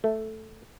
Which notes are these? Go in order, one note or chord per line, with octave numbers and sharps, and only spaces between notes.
A3